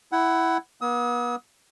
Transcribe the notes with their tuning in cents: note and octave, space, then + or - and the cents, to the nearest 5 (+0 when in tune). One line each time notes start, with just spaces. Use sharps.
E4 +0 F#5 +20
B3 -40 D#6 +40